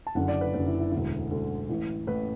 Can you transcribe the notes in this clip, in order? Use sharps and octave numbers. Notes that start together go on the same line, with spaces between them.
A5
F#1 F#2 D3 F#5
D5
B4
F#1 F#2 D3 B4
E4
E4
E1 D2 D3 E4
E1 D2 D3
A1 A2 E3
A1 A2 E3 B4